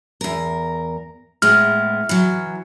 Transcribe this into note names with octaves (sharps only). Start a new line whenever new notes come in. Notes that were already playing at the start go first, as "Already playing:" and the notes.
E2 A#4
A2 G#3 B3 F6
E3 F#3